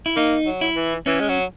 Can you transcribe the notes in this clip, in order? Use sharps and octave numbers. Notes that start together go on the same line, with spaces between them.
E4
A#3 D#4
F#3
E4
E3
E3 C#4
G#3
F#3